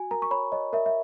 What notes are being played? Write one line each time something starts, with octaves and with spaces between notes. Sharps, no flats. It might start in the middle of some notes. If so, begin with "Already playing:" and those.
Already playing: F#4 G#5
A#4 A#5
C#6
C#5 B5
C#5 D#5
A#4 E5
E5